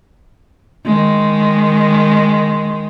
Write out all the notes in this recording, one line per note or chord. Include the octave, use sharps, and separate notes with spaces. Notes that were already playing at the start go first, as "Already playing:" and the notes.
D#3 G#3